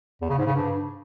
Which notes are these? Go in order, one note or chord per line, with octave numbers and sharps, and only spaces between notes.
E2
C#3
G#2
C#3
G2